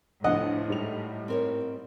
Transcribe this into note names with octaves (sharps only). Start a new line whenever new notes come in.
D2 A2 F3 D#5 F#5
G#2 G3 F7
C4 A#4 C#5